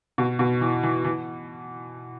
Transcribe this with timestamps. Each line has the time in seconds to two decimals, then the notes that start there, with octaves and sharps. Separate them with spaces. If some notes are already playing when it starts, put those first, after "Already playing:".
0.18 B2
0.39 B2
0.61 E3
0.83 E3
1.04 E3